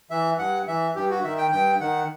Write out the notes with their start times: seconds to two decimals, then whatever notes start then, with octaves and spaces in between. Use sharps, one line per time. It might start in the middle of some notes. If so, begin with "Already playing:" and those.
0.11 E3 E5
0.38 G2 F#5
0.68 E3 E5
0.95 G2 G4
1.10 F#4
1.24 D#3 E5
1.37 G5
1.52 G2 G5
1.80 D#3 F#5